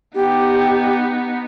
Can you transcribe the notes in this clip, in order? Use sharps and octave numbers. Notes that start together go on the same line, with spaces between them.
B3 D#4 G4